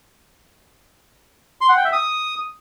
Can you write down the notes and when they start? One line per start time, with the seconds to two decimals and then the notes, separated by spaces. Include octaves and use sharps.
1.61 C6
1.69 F#5
1.77 G5
1.85 E5
1.92 D#6